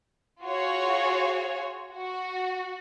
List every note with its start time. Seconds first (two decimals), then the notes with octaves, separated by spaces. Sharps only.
0.43 F4 F#4 G#4 C#5
1.92 F#4